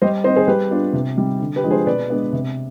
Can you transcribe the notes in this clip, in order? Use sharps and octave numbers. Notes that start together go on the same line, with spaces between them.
G3 C5 D#5
C4 D#4 C5 D#5
G#4 C5
G3 G4 B4
B3 D4 F4
C3
G3 C4 D#4
D3
G4 B4
F3 G#3 D4
G#4 C5
B2 B4 D5
G#3 B3 D4
C3